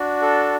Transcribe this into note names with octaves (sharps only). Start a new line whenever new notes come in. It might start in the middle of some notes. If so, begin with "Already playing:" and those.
Already playing: D4 F#4
A4